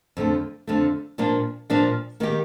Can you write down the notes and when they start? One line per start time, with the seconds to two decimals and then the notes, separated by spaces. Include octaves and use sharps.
0.17 F2 D3 A3
0.67 F2 D3 A3
1.18 A#2 F3 A#3 D4
1.70 A#2 F3 A#3 D4
2.20 D#3 A#3 D#4 G4